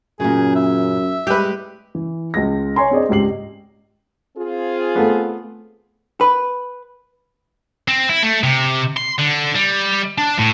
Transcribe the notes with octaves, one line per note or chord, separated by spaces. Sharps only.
F#2 A#2 C#3 G#4
E5
G3 G#3 G4 B4
E3
C#2 G#3 A#6
C#5 G#5 A#5 C6
C4 D4 G#4 D5 D#5
C#2 G#2 G4 C7 F#7
C4 F4 G#4
A3 B3
B4
C4
E4
A3
C3
C6
D3
G3
D4
A2